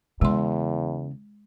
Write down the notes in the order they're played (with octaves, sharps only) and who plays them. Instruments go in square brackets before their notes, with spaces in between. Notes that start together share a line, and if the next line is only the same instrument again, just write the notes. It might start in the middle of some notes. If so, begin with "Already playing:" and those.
[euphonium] E2 [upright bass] C#3 [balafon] G#3 C6